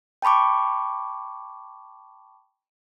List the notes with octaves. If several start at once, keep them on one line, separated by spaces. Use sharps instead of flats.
G5 A5 B5 C#6 D6